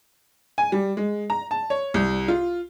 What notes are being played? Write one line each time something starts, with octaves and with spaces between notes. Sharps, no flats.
G#5
G3
G#3
A#5
A5
C#5
C2
F4